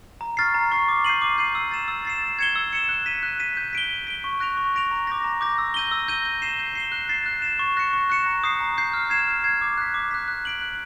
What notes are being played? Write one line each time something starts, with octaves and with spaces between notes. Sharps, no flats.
A#5
C#6 F6 A6 C7
A#5
C#6 F6 A6 C7
D6
G6 C7 D#7 F#7
D6
G6 C7 D#7 F#7
E6
A6 C7 E7
E6
A6 C7 E7
E6
G#6 C#7 E7 G7
E6
G#6 C#7 E7 G7
F#6
B6 D#7
F#6
B6 D#7
G6
B6 D7 G7
G6
B6 D7 G7
C#6
F#6 A#6 D7 F7
C#6
F#6 A#6 D7 F7
A#5
D6 G6 A#6
A#5
D6 G6 A#6
E6
G6 A#6 D#7 G7
E6
G6 A#6 D#7 G7
G6
C7 E7 G7
G6
C7 E7 G7
F#6
A6 C7 E7
F#6
A6 C7 E7
C#6
F#6 A#6 C#7 E7
C#6
F#6 A#6 C#7 E7
A#5
D#6 G6 C7
A#5
D#6 G6 C7
F6
G#6 C7 E7
F6
G#6 C7 E7
D6
F#6 B6
D6
F#6 B6
F#6
B6 D7 F#7
F#6